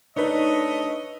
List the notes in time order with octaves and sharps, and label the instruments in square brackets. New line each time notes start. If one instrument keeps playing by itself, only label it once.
[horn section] A3 C#5 D#5 [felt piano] D4 D#4 B4